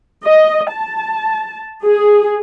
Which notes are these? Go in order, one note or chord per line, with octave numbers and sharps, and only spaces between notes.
D#5
A5
G#4